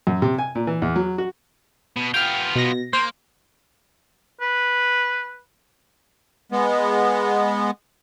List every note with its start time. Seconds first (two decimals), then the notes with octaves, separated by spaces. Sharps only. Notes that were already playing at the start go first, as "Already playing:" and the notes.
0.07 F#2
0.22 C3
0.39 G#5
0.55 A#2
0.67 E3
0.82 E2
0.96 F#3
1.18 F#4
1.96 B2
2.14 B3 F4 G5 F6
2.56 B2 A#6
2.93 A#3 C5
4.41 B4
6.52 G#3 B3